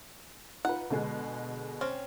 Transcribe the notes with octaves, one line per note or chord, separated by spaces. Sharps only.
D#4 F4 B4 F#5
B2 D3 G#3
C4 C#4